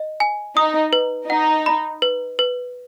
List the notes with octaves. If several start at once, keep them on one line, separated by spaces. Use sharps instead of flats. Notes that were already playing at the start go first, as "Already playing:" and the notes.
Already playing: D#5
G#5
D#4 D#6
B4
D#4 F#5
B5
B4
B4